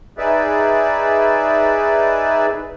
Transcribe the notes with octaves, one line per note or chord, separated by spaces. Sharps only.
D#4 G#4 B4 D5 E5